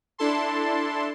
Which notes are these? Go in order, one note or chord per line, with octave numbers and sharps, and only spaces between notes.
D4 E4 A4 A5 C6